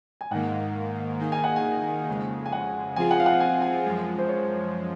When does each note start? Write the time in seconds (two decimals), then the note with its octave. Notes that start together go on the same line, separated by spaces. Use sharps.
0.21 G#5
0.31 G#2 D#3 A#3 F#5
1.19 D#3 A#3 D#4 G#4
1.32 G#5
1.44 F#5
1.56 G#5
2.09 F2 C#3 G#3
2.46 G#5
2.52 F#5
2.96 F3 C4 F4 G#4 G#5
3.11 F#5
3.20 F5
3.26 F#5
3.40 G#5
3.62 G#5
3.85 F#2 F3 G#3
4.18 C5
4.29 C#5